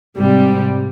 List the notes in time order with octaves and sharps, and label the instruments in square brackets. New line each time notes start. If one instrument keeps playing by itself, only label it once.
[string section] G#2 C3 G3